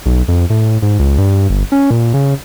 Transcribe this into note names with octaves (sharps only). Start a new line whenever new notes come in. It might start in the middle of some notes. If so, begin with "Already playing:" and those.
B1
F2
A2
G#2
C#2
G2
G1
C#4
A#2
C#3